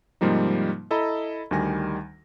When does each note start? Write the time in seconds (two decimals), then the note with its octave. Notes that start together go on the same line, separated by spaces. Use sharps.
0.21 G#2 C3 F3 G3 A#3 D#4
0.91 E4 A4 D#5 A#5 B5
1.51 D2 D#3 G3 G#5 A#6